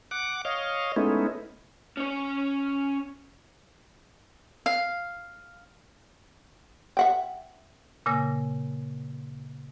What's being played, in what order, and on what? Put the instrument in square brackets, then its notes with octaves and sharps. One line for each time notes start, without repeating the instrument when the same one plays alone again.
[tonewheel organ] F#5 D6
C#5 D#5 F5
G#3 A3 B3 C#4 D#4 E4
[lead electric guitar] C#4 C#5
[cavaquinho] F5
[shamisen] E5 F#5 G5
[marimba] A#2 C#3 A#3 G#5 E6 A#6